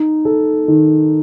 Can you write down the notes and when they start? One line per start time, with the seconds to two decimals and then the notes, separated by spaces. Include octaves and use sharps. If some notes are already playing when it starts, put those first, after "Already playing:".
Already playing: D#4
0.25 A4
0.68 D#3